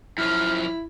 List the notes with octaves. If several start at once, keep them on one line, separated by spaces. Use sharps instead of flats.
F#2 F3 E4 F6